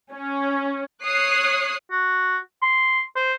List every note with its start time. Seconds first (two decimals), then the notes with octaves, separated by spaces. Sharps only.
0.12 C#4
1.03 C#5 D#6 F#6 C7
1.91 F#4
2.62 C6
3.16 C5